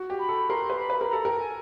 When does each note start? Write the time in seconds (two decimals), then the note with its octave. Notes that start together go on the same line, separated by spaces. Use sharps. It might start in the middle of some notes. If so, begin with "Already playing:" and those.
Already playing: F#4
0.10 G4
0.19 B5
0.29 A4
0.50 A#4 C6
0.70 B4
0.80 B5
0.90 B4
1.00 A#4 B5
1.10 A4 A#5
1.25 A#4 G5
1.39 G#5